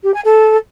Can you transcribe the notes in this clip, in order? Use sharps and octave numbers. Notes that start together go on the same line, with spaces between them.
G4
G#5
A4